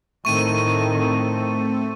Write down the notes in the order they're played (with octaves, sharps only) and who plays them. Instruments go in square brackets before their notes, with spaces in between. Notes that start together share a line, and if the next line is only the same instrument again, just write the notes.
[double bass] A2 D#3 [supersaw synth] A3 C4 A4 [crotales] C#6 D#7